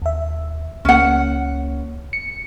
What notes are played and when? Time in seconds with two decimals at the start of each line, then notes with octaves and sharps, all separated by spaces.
0.02 D#2 E5
0.85 C#2 A#3 C#4 F#5
2.13 C#7